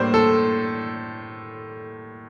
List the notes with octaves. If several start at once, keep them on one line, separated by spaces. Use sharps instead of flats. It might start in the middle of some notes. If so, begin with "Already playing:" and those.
Already playing: A2 G3 A#3 D4 C5
A4